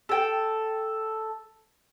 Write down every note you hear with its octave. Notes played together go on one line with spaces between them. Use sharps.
A4 G5